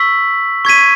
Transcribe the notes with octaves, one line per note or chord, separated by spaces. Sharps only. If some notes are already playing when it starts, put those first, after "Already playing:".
Already playing: C#6 E6 B6 F#7
C#6 G#6 B6 D#7